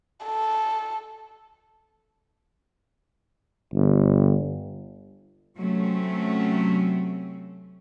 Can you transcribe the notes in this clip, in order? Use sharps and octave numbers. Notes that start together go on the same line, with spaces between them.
A4
G1
C3 F#3 A3 C4 C#4